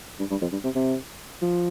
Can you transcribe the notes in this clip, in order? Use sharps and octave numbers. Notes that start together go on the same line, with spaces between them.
G2
G2
F2
G2
C3
C3
F3